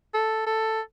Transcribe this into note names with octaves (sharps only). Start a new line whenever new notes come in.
A4
A4